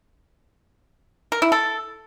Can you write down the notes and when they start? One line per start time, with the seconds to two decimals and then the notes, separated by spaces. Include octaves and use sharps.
1.32 A#4
1.42 E4
1.52 A4